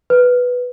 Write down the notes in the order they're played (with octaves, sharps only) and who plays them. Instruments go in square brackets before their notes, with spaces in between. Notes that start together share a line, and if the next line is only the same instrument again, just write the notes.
[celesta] B4